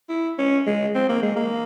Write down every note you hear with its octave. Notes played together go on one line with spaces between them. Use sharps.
E4
C#4
G#3
C4
A#3
G#3
A#3